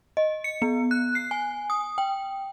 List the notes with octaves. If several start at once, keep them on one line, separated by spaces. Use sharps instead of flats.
D#5
C#7
B3
F#6
C7
G#5
D#6
G5